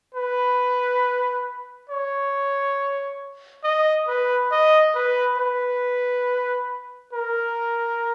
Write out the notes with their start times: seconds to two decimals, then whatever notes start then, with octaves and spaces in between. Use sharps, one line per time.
0.15 B4
1.90 C#5
3.64 D#5
4.08 B4
4.52 D#5
4.95 B4
5.38 B4
7.13 A#4